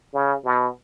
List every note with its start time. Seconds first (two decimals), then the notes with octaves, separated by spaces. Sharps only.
0.14 C#3
0.45 B2